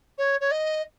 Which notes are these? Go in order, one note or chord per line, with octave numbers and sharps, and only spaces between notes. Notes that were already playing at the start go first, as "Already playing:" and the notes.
C#5
C#5
D#5